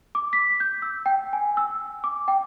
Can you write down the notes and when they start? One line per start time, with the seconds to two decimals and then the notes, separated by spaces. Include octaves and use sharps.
0.15 D6
0.33 B6
0.60 G6
0.82 E6
1.06 G5
1.33 G#5
1.57 E6
2.04 D6
2.28 G5